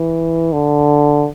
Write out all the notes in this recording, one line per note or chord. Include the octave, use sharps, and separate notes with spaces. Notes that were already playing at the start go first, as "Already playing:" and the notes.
Already playing: E3
D3